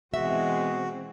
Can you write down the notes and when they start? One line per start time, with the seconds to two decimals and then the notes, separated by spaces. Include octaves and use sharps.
0.14 B2 E3 G#3 C4 F#4 E5